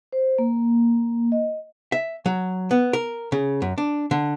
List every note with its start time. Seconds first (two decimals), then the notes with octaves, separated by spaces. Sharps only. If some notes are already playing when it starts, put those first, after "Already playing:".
0.12 C5
0.38 A#3
1.32 D#5
1.92 E5
2.26 F#3
2.71 B3
2.93 A#4
3.32 C#3
3.62 F#2
3.78 D4
4.11 D3